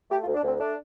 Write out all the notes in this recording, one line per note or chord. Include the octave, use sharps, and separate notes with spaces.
A3 G4
F4
D2
D4
D2 C4
A3 D4